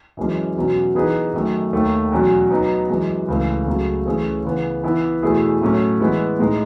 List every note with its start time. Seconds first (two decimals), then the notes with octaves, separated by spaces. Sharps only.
0.17 F#2 E3 G#3 C#4
0.56 E2 B2 F#3 C#4
0.95 E3 B3 D#4 G#4 B4
1.34 F#2 D#3 A3
1.73 D#2 D#3 A3
2.12 E2 B2 F#3 C#4
2.50 F#3 B3 D#4
2.89 F#2 E3 G#3
3.28 C#2 C#3 E3 A3
3.67 C#2 C#3 F#3 A3
4.06 E3 A3 C#4 G#4 C#5
4.45 C#3 E3 B3
4.83 E3 B3 E4 B4
5.22 E2 B2 A3 E4 G#4
5.61 A2 F#3 A3 C#4
6.00 E3 G#3 B3 E4
6.39 A2 G#3 D#4